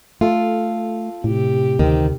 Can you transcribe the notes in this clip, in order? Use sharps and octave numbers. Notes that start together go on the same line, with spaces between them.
A3 F4 A4
A2 C3 G4
D2 D#3 C4